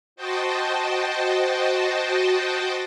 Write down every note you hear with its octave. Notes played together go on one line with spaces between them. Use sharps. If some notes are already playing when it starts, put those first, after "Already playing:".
F#4 C5 D#5 G5 A5